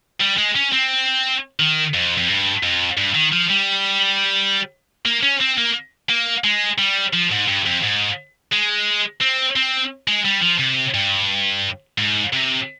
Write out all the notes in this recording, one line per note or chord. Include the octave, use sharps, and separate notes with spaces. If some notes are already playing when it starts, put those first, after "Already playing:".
G3
G#3
C#4
C4
D#3
F2
F2
G2
F2
G2
D#3
F3
G3
A#3
C#4
C4
A#3
A#3
G#3
G3
F3
G#2
G2
F2
G#2
G#3
C4
C4
G#3
G3
F3
C3
G2
G#2
C3